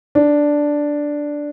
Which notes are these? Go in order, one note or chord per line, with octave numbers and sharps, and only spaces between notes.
D4